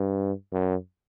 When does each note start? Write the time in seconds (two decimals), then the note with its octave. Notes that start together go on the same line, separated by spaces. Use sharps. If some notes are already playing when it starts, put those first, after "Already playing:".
Already playing: G2
0.53 F#2